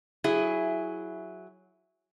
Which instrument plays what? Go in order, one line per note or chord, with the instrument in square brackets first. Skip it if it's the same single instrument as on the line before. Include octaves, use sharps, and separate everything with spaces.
[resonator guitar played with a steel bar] F#3 E4 G#4